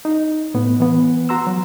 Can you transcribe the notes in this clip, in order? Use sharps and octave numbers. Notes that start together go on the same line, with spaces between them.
D#4
A2 B3
E3 B3
F#4 A#5 C6 E6
F#3